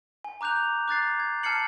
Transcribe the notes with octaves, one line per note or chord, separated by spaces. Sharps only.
G#5
A#5 D6 F#6 G6 F7
D6 F#6 A6 C7
G#6
A5 F6 G#6 C7 C#7 F#7